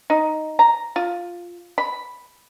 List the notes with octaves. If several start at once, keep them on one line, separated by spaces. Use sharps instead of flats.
D#4
A#5
F4
B5